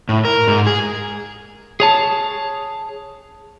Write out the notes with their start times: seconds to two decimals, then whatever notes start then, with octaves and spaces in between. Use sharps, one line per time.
0.09 A2
0.25 A#4
0.48 G#2
0.67 G#4
1.80 G#4 C#5 A5